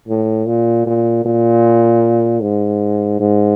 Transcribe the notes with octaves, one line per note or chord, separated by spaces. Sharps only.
A2
A#2
A#2
A#2
G#2
G#2